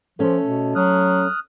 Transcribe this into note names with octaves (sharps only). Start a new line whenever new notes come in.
F3 A3 C#4 A4
B2
F#3 D#6 F6 F#6